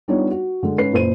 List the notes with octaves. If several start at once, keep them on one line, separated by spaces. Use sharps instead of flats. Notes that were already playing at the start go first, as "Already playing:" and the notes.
G3 B3 D4 D#4 F4 C#5
F#4
D3 G#3
G#2 C#4 B4 C7
F#1 A#2 B4 C5 D#7